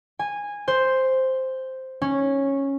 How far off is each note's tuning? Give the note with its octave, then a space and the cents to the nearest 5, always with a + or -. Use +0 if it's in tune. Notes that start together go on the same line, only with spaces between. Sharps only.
G#5 -15
C5 +0
C#4 -10